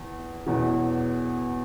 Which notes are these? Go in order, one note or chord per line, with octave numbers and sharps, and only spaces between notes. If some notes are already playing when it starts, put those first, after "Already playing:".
Already playing: E2
E2 B2 F#3